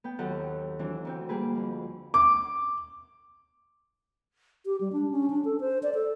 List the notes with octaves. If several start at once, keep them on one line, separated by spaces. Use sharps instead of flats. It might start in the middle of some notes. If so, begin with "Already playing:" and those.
B3 G5
D#2 F#3 A4 F#5
E3 F#3 C4 D4
D2 C4 G5
G3 A#3 G#4 B4
F2
D6
G4
G3
D4
C#4
D4
A4
C5
D5
A4